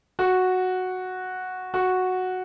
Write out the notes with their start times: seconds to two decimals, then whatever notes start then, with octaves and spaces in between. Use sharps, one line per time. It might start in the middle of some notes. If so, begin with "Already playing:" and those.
0.19 F#4
1.74 F#4